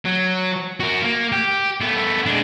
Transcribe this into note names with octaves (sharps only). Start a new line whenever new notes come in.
F#3
F#4 A#4
A#3
G4
A3 B3
G#3 D4